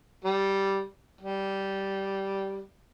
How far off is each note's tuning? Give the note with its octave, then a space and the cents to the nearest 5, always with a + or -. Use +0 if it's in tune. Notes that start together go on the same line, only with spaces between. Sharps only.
G3 -5
G3 -10